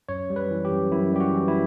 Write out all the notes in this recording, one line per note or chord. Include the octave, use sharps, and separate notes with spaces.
F#2 C#5
G3
B4
E3
G4
F#2
F#2 E4
G3 G4
F#4
E3
E4